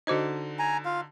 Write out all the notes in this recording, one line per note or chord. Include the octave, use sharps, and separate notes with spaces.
D3 D#4 F#4 C5 D#5
G#5 A#5
F4 F5